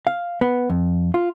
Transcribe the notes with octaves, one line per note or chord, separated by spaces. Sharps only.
F5
B3
F2
F4